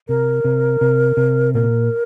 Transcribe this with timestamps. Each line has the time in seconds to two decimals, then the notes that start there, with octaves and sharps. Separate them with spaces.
0.08 C3 A#4
0.45 C3
0.81 C3
1.17 C3
1.54 A#2 A#4